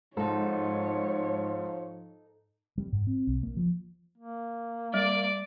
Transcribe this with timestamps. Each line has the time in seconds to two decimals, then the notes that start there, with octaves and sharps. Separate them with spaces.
0.17 G#2 F3 D#4 A4 C#5
2.78 G3
2.93 G#2
3.07 C4
3.27 B1
3.43 A#3
3.57 F3
4.18 A#3
4.94 G3 D5 D6